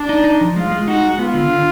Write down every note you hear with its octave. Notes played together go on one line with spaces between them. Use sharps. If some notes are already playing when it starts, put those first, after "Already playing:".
Already playing: D4
D#4
D#4
F3
G#3 F4
G#3
D#4 F#4
G#3
B3 F4
D3
D3